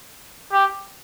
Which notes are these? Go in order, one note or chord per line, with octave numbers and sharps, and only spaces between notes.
G4